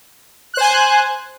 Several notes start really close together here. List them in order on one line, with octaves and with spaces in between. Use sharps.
F#6 C5 G#5